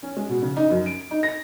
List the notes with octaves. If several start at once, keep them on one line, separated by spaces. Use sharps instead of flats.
C#4
G#3
B2
C#3
D#4
F#2
D7
D#4
A#6